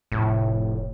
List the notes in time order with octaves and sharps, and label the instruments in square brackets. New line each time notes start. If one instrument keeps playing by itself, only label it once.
[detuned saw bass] F1 [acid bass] A2